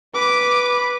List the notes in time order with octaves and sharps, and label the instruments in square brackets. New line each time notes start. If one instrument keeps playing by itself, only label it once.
[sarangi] B4 [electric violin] D6